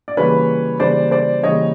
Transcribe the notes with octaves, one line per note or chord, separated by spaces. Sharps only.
D5
C#3 E3 G3 A#3 B4 C#5
C#3 E3 G3 A#3 C5 D5
C5 D5
C#3 E3 G3 A#3 C#5 D#5